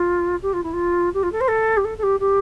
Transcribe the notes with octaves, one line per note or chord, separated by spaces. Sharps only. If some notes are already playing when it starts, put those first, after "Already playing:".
Already playing: F4
G4
F4
E4
F4
G4
F4
A4
C5
A4
G4
A4
A4
G4
G4